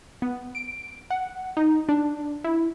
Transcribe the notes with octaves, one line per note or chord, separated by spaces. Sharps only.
B3
D7
F#5
D#4
D4
E4